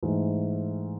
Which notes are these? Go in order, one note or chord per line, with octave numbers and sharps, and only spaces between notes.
G#2 E3 A3